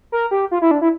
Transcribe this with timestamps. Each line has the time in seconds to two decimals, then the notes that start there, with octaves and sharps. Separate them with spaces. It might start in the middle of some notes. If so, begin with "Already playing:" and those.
0.12 A#4
0.31 G4
0.51 F4
0.62 E4
0.71 D4
0.81 E4